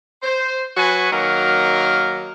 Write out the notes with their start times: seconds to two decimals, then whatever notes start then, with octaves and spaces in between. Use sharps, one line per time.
0.22 C5
0.76 F#3 F#4 B4 G#5
1.12 D#3 F#3 A#3 A#4